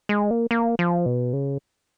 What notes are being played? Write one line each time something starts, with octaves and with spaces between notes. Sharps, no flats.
G#3
A#3
A#3
F3
B2
C#3